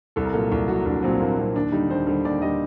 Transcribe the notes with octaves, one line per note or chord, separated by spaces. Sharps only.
C2 A4
A#4
A#2 F#3 A4
C2
A#2 F#3 F#4
C2 D4
A#2 F#3 C4
C2 A#3
A#2 F#3 C4
D#2 D4
D3 G3 D#4
D#2 C5
D3 G3 C5
D#2 D5
D3 G3 D#5